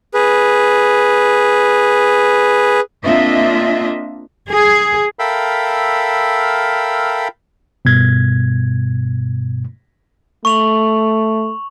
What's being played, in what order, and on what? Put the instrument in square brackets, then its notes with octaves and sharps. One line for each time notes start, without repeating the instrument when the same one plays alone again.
[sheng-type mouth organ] G#4 B4
[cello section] A#3 C4 D4 F4 D#5 E5
G#4
[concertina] A4 A#4 E5 F5 G5 B5
[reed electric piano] G2 B2 G#6
[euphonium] A3 [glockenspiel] C#6 F7 F#7